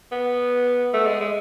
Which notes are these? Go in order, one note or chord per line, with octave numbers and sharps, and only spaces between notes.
B3
A3
G#3
G#3